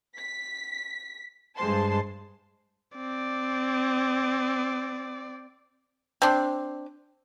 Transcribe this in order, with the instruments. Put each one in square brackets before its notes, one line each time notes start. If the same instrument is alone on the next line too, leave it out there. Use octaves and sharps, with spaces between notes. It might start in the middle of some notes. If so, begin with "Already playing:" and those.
[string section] B6
G2 G#3 C5 A5 C6
[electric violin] C4 D5
[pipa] C4 D4